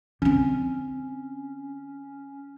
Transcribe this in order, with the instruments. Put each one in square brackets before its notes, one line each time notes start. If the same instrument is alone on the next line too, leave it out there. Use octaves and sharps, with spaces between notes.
[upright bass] D3 C4 [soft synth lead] C#4